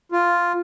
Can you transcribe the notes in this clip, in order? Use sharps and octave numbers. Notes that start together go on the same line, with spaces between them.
F4